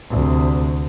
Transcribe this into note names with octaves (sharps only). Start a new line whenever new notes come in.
D2 C3